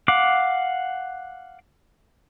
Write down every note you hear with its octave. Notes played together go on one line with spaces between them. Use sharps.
F5 F#5 D6